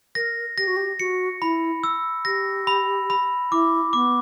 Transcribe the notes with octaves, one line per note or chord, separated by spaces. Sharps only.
A#4 A#6
G4 A#6
F#4
G4
F#4 C#7
E4 B5
E6
G4 A#6
B5
B5
E4 D6
B3 D6